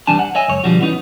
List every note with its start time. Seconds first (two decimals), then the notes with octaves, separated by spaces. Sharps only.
0.07 C2 E3 G3 D4 G#5 A5
0.19 F#5
0.35 C#5 D#5 E5 G#5
0.48 C#2 F#2 C#5
0.64 B2 D3 F3 G3 F#4
0.81 E3 B3 C#4 D#4